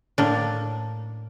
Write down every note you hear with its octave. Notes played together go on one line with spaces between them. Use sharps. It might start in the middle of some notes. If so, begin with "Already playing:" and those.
A2 A#3 D4